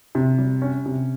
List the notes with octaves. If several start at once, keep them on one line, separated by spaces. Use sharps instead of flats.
C3
G3
C#4
C3